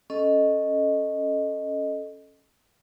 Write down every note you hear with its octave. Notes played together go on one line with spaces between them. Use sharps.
C#4 A4 D#5